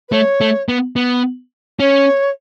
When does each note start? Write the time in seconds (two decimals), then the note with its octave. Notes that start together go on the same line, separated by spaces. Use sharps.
0.09 B4
0.12 A3 C#5
0.41 A3
0.69 B3
0.96 B3
1.79 C#4 C#5